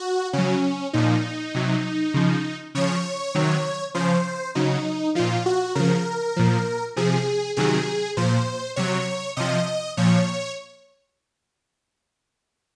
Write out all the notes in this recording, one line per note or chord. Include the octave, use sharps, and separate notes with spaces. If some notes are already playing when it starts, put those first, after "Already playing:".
Already playing: F#4
C#3 F#3 C#4
A#2 F3 D#4
C3 F#3
C#3 F3
C#3 F3 C#5
C3 D#3 F#3
C#3 F3 C5
C#3 F#3 D#4
A#2 F3 F4
F#4
C#3 F3 A#4
A#2 F3
C3 F3 G#4
C3 D#3 F#3 G#4
A#2 F3 C5
C3 F#3 C#5
C3 F3 D#5
A#2 F3 C#5